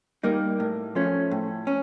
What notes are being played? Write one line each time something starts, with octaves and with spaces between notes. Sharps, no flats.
G3 A#3 D#4
A2
F3 A3 C#4
A2
C#4